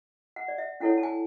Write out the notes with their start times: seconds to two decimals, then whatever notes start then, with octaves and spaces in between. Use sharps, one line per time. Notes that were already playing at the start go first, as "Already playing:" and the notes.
0.36 F#5
0.48 D5
0.58 E5
0.80 C#4 E4 A4 C#5 F#5
0.98 A5
1.03 G#5